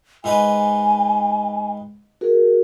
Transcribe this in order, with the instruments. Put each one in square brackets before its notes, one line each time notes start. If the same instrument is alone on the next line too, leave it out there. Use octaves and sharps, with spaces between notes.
[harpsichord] G#2 D#4 B4 [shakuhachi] G#5
[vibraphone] F#4 G#4 A#4